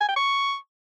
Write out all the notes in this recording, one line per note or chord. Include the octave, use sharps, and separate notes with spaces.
G#5
G5
C#6